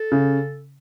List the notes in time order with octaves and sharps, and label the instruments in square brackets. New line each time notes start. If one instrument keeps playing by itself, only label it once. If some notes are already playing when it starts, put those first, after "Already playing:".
Already playing: [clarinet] A4
[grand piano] C#3